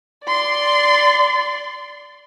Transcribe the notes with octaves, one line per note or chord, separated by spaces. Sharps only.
D5 C6